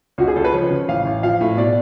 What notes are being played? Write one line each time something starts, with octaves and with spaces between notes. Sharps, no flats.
C#2 F#4
G#4
C#2 A4
B4
F3 C#5
C#3
A1 F5
A1
F3 F5
A2
B2 D5